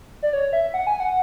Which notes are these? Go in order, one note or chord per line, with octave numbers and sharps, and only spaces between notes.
D5
C#5
E5
F#5
G#5
F#5